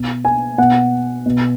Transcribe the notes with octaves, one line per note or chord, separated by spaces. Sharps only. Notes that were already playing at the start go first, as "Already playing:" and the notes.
Already playing: B2
G#5
B2 F#5
B2